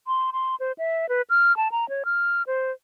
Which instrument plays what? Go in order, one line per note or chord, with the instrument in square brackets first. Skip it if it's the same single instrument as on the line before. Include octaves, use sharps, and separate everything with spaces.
[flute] C6
C6
C5
E5
B4
F6
A5
A#5
C#5
F6
C5